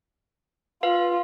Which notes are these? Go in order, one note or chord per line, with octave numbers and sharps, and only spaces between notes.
F4 B4 F5